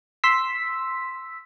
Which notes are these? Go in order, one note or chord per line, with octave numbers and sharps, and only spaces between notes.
C6 E6 B6